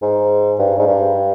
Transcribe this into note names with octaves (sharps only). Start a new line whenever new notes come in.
G#2
G2
G#2
G2